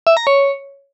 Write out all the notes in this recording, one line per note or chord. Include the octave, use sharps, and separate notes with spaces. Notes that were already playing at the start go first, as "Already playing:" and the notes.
E5
A#5
C#5